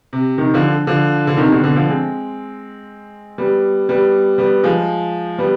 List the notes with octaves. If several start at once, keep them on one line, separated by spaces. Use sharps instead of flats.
C3
C3 D#3
D3 F3
D3 F3
D3
C3 D#3
B2 D3
B2 D3
D3 F3
G#3 C4
G3 B3
G3 B3
G3 B3
F3 G#3
G3 B3